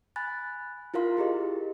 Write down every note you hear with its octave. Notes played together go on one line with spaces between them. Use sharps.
G#5 B5 F#6 A6
E4 F4 A#4 F5 C6
E4 G4 G#4 D#5